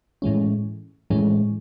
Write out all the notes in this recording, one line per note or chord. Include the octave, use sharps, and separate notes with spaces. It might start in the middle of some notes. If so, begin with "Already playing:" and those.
A2 E3 G#3 C#4
A2 E3 G#3 C#4